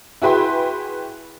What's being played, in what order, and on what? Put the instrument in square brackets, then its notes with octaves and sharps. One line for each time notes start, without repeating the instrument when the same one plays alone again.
[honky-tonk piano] E4 F#4 G#4 B4 G5 C6